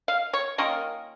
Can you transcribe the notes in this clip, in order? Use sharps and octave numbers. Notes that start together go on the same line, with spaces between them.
F5
C#5
D#3 A#3 C#4 F4 A#4